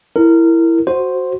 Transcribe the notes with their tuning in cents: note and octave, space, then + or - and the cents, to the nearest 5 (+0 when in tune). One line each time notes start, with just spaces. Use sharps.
E4 +10 A#4 -20
F#4 +0 C5 +0